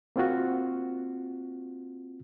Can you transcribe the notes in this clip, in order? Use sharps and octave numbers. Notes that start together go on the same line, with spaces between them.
A#3 C4 F4 F#4